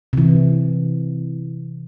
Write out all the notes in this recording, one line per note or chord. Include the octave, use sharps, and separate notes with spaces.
C3 E3